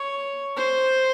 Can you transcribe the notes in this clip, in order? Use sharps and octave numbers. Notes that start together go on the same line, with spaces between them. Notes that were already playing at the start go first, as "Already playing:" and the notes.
Already playing: C#5
C5